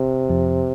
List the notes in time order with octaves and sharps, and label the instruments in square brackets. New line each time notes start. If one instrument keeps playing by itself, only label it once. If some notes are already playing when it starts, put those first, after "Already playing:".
Already playing: [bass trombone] C3
[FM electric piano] F2 F3